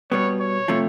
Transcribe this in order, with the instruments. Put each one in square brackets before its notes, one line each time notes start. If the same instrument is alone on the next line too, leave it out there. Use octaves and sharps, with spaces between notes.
[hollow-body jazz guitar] B2 G3 B3 [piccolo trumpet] C#5
[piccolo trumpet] C#5
[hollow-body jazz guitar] C3 F3 A3